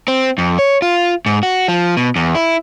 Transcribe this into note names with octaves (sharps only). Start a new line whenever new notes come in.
C4
F2
C#5
F4
G#2
F#4
F3
B2
E2
E4